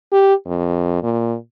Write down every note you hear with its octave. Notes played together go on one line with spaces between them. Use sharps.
G4
F2
A#2